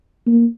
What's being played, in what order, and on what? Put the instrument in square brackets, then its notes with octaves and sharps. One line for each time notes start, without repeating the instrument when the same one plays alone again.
[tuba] A#3